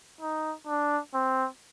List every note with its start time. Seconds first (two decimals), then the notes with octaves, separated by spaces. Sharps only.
0.21 D#4
0.67 D4
1.14 C4